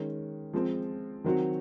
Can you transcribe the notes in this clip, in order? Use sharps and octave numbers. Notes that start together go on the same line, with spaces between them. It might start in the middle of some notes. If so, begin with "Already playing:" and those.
Already playing: D#3 G#3 C#4
F3 G#3 C4
D#3 F#3 C4 F#4